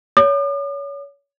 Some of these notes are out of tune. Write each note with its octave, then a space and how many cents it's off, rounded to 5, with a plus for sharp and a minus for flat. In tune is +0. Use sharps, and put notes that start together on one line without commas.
C#5 +25 D6 +45